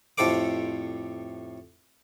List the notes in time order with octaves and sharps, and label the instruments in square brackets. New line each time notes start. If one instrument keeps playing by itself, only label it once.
[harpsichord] F2 A2 G4 A4 C5 D6